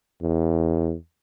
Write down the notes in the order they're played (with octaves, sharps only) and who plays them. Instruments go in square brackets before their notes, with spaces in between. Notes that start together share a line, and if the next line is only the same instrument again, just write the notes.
[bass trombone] E2